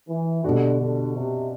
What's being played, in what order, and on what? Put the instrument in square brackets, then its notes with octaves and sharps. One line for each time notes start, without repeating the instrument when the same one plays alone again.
[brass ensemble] E3
[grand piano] B2 G3 D4 F#4 [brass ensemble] D3
[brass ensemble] D3
C3